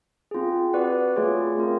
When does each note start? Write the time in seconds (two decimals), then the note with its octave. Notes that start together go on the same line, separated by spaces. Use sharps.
0.31 C4 F4 G#4
0.73 F#4 B4 D5 F#5
1.16 A3 C4 F4 G#4 C#5
1.58 C4 F4 A#4